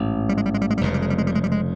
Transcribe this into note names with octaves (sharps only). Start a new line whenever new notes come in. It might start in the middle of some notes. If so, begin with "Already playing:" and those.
Already playing: A1 G#2
G3
G#3
G3
G#3
G3
G#3
G3
F1 F2 C#3 G#3
G3
G#3
G3
G#3
G3
G#3
G3
G#3